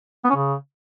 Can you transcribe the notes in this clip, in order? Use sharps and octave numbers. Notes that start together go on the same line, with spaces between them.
B3
C#4
C#3